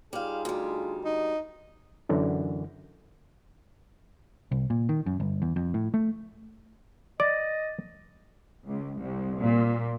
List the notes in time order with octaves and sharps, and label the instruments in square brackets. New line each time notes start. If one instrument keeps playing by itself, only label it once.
[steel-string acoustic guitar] G3 F5 [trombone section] D#4 F4 G#4
[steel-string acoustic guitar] D2 G3
[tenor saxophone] D#4
[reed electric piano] F#2 D3 E3
[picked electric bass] C2
A#2
D#3
F#2
G1
E2
F2
A2
A3
[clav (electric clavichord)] D5 [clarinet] D#5 [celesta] A6
[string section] C#2
C2
A#2